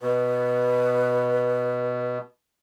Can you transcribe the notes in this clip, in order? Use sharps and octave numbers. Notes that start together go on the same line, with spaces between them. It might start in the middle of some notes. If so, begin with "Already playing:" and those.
B2 B4